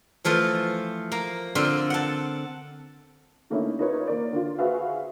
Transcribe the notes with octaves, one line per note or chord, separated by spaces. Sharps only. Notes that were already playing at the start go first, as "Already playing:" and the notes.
E3 F3 A3 F4
A#3
D3 C4 F4
F#5 A5
D3 A3 A#3 C#4 D#4 E4
D#4 F4 A#4 B4 C#5
A#3 A#4 C5 D5
D3 F4
F#4 G#4 B4 C5 E5 F5